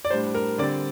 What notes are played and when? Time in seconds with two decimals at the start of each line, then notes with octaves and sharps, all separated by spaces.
0.05 D5
0.10 A2 G3 D4 C5
0.35 A#4
0.58 D3 G3 C4 D5